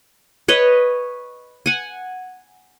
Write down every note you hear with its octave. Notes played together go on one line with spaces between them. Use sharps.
B4 C#5 D#5
F#5 G#5